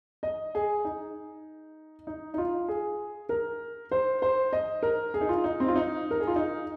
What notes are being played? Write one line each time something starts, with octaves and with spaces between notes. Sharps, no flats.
D#5
G#4
D#4
D#4
D#4
F4
G#4
A#4
C5
C5
D#5
A#4
G#4
D#4
F4
D#4
C4
F4
D#4
A#4
G#4
F4
D#4